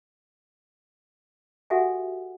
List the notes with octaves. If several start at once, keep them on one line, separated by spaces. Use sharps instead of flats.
F#4 G4 A4 E5 F#5 G#5